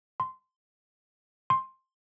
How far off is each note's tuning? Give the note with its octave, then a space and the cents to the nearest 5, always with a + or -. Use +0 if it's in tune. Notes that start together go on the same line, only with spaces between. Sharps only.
C6 -15
C6 +10